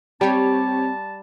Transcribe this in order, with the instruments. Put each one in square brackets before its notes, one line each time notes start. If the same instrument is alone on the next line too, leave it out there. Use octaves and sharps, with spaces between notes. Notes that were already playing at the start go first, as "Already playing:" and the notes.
[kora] G3 [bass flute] C4 [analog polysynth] G4 C#5 [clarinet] A5